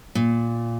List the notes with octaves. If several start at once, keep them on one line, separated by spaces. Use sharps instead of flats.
A#2